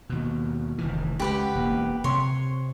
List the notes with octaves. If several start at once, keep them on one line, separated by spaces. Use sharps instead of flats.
D#2 B2
F1 D#3 E3
C#2 G4 B4 F#5
E1 A#3
C3 C#5 C6